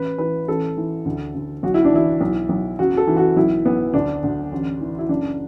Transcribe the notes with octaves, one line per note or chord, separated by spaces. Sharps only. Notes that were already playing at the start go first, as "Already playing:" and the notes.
Already playing: A1 B4
E3 B4
A1 A4
E3
D2
D2
B1 F#4
E4
D4
E3 E4
B1
B1
F#1 F#4
A4
E3
F#4
B1 E4
B1 B3
D2 D4
D2
A1
E3
E4
F#1 D4